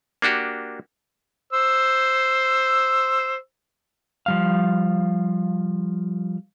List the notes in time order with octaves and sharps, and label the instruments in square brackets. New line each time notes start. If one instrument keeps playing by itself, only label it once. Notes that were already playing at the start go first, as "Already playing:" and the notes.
[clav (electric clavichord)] A#3 D4 F#4 G4
[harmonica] C5 E6
[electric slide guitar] F3 G3 F5